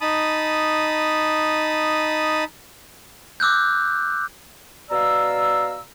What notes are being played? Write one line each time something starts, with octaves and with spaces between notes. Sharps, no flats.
D#4 A5 B5 D#6
D6 E6 F#6 G6
B2 D5 F5 A#5 E6